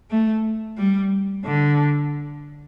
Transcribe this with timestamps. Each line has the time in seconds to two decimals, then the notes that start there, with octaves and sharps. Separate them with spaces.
0.10 A3
0.77 G3
1.45 D3